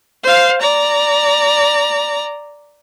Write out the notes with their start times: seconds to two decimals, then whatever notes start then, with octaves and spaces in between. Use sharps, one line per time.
0.23 C5 F5
0.61 D5 A#5